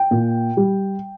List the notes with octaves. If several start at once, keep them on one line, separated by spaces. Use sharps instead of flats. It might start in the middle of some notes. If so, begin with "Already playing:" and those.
Already playing: G5
A#2
G3